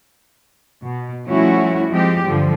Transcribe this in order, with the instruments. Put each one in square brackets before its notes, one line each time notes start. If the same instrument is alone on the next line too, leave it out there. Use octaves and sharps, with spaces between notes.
[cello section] B2
F3 G3 A3 C#4 E4 F#4
F3 G#3 C4 G4
G2 D3 F3 G3